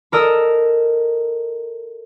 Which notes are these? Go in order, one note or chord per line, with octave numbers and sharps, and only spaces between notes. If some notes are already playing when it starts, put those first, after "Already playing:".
A4 A#4 D#5 E6